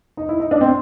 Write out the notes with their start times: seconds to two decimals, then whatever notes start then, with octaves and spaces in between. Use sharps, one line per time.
0.17 D#4
0.29 E4
0.40 D#4
0.51 D4
0.61 C4